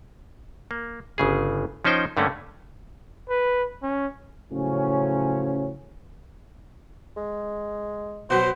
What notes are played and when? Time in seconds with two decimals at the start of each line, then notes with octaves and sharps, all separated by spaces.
0.71 A#3
1.18 G1 C#3 G#4
1.85 F3 C#4 D#4 C5 G5
2.17 G2 D3 A3 A#3 C#4
3.29 B4
3.82 C#4
4.51 A2 C#3 F3 F#3 C#4
7.17 G#3
8.30 B2 F#3 F#4 C5 B5